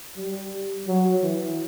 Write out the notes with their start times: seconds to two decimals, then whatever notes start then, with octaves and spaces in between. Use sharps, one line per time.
0.17 G3
0.87 F#3
1.23 E3